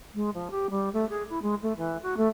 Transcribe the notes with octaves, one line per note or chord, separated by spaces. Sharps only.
G#3
F3
G4
G3
A3
G#4
E4
G#3
A3
E3
F#4
A3